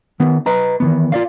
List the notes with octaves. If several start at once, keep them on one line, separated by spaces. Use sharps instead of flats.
D#3 B3
B4 D#5 A#5
D#3 E3 B3
F4 D5 F5